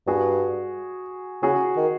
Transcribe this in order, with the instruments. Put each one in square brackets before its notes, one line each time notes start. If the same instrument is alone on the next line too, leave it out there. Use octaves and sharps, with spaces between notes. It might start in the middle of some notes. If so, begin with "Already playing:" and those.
[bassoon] G2 [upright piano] F#4 G#4
[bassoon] C#3 [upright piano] F#4 G#4
[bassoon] D#3